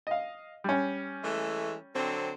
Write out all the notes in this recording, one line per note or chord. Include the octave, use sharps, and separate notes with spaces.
D#5 F5
G3 C#4
E3 G#3 A3
D3 F#3 C4